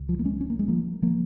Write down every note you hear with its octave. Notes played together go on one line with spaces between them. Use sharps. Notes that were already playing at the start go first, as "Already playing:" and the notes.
Already playing: C#2
F3
A#3
G#3 C#4
C#4
A#3
G#3
F3 A#3
F3 A#3